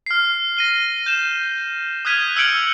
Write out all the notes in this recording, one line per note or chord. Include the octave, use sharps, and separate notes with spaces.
F6 C7
A#6 D#7 G7
G6 E7
D#6 F6 F#6 G#6 B6 D#7
E6 F6 G6 C#7 D7 F#7